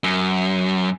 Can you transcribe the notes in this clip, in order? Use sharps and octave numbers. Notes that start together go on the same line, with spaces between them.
F#2